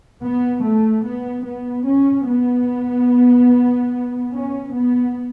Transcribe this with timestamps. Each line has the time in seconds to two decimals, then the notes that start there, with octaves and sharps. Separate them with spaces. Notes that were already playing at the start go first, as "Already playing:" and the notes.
0.22 B3
0.62 A3
1.04 B3
1.45 B3
1.85 C#4
2.27 B3
4.33 C#4
4.74 B3